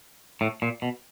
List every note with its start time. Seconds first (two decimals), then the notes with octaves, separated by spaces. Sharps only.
0.41 A2
0.62 A#2
0.82 B2